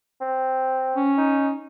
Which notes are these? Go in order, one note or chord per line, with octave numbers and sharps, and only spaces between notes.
C4
C#4
D#4